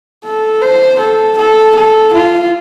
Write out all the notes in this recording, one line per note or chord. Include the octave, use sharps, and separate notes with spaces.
A4
C5
A4
A4
A4
F4